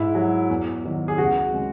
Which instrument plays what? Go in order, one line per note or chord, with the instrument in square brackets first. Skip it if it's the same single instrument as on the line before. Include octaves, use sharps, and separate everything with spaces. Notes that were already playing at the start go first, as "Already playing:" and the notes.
Already playing: [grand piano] G#2 E4
F#3
E2
D#3 F#3
G#4
C#2 F#4
C#3 G#3